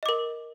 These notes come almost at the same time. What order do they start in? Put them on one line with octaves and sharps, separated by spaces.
D#5 D6 A#4